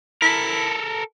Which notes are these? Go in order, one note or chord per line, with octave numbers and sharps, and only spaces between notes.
E4 A4 A#4